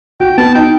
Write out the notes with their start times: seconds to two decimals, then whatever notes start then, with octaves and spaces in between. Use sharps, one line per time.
0.20 F#4 G5
0.38 B3 A5
0.55 D#4 G5